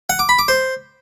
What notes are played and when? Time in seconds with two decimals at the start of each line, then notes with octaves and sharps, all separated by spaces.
0.10 F#5
0.19 D6
0.29 B5
0.39 D6
0.48 C5